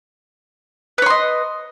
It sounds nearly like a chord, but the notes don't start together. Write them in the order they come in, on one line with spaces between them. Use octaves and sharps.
B4 C#5 C6 D#5